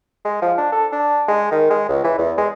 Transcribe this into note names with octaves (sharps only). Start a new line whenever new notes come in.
G#3
F3
D4
A4
D4
G#3
D#3
G#3
C#2
E3
E2
G#3